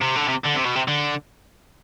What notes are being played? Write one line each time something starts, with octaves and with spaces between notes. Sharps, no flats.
C3
D3
C3
D3
C3
B2
C3
D3